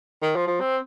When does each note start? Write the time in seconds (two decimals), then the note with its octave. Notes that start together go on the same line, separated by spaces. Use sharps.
0.22 D#3
0.36 F3
0.47 F3
0.60 C4